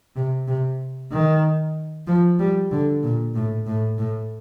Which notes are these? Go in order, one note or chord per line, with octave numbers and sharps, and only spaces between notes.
C3
C3
D#3
F3
G3
D3
A#2
A2
A2
A2